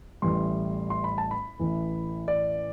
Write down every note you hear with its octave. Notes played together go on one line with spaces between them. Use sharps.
A1 A2 E3 G3 C6
C6
B5
A5
B5
A1 A2 E3
D5